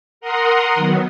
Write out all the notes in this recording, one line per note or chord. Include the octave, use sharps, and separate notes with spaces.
A#4 F#5 A#5 C6 D#6
D#3 F#3 B3